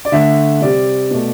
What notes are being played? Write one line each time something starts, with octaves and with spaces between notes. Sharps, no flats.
D5
D3 A3 E5
C3 G3 D5
B2 A3